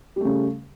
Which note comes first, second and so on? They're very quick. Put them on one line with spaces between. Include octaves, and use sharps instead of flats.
G3 A3 C#3